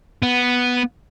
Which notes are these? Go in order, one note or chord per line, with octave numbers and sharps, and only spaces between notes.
B3